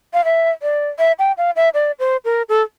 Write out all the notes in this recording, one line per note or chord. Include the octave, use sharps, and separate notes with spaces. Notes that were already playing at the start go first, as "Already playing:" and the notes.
F5
E5
D5
E5
G5
F5
E5
D5
C5
A#4
A4